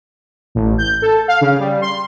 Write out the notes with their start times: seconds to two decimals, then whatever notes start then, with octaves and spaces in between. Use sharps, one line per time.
0.55 A1
0.78 G6
1.02 A4
1.28 F5
1.41 C#3
1.60 G3
1.81 C6